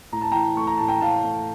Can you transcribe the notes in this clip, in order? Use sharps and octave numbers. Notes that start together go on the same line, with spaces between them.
A2 A#5
A5
E3 G5 A#5
A3 C#6
A#5
A2 A5
G5 A#5
A2 F5 A5
A3